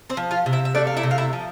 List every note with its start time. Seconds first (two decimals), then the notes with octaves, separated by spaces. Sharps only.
0.10 C4 C5
0.17 F3
0.31 F4 F5
0.46 C3
0.53 E4 E5
0.65 E5
0.75 A3 D4 D5
0.87 F5
0.97 E4 E5
1.03 C3
1.11 F5
1.18 E4 E5
1.33 F3